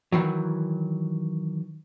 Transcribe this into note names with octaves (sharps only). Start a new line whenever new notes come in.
D#3 E3 F#3